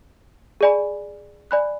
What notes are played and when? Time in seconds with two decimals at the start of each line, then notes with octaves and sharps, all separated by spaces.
0.61 G#4 D5 G#5 B5
1.51 D5 G#5 B5 F#6